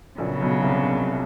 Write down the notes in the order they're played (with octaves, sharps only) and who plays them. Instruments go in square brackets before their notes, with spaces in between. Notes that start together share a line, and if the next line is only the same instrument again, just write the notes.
[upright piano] A#1 A#2 [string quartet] C#3 F#3 B3
[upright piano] B1 B2
C2 C3